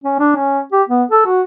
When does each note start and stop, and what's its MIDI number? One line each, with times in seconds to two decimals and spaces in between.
0.04 0.16 61
0.20 0.34 62
0.36 0.61 61
0.72 0.83 67
0.89 1.03 59
1.12 1.23 69
1.26 1.42 66